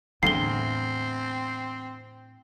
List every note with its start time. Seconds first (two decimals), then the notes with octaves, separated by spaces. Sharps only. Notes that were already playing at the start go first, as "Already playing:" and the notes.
0.23 E2 A2 D3 C4 C7 G7